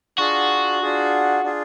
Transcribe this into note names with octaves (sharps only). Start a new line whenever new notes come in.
D4 F4 F#4 G#4
D4 F4 G#4
D4 F4 G#4